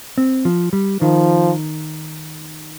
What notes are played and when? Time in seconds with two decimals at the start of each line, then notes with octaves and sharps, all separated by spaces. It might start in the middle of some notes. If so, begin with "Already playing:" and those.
0.18 C4
0.45 F3
0.73 G3
1.01 D#3 F3